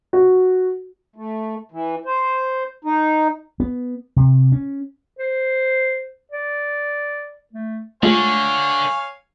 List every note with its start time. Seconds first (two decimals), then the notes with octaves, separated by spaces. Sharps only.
0.13 F#4
1.16 A3
1.71 E3
2.05 C5
2.84 D#4
3.60 B3
4.16 C3
4.52 C#4
5.19 C5
6.31 D5
7.53 A3
8.03 D3 G#3 A3 F4 C#5 F5 G#5